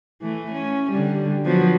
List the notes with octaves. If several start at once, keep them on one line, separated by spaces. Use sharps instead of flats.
E3 A3
C#4
D3 G3
F3 F#3 B3